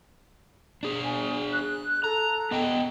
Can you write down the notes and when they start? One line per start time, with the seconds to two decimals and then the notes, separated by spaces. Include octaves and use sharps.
0.83 D4 G#4
1.04 G#5
1.53 F#6
2.04 A4 A#5
2.51 B3 D#5 G5